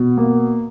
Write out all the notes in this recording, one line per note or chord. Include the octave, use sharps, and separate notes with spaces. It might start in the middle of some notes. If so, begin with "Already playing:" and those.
Already playing: B2
A#3